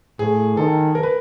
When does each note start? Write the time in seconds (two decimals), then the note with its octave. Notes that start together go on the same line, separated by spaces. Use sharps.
0.19 A2 G#4
0.57 D#3 A4
0.95 A#4
1.03 B4